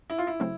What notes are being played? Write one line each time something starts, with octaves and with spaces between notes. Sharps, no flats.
E4
F4
E4
C#3 F#3 A3 C4